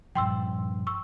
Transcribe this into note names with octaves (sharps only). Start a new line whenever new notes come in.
G2 A#2 F3 G5 C6 E6
C#6 E6